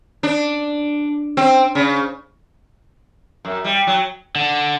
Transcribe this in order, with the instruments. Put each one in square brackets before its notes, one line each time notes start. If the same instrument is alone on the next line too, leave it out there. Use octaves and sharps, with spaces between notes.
[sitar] D4
C4
C#3
F#2
G3
F#3
[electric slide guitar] D3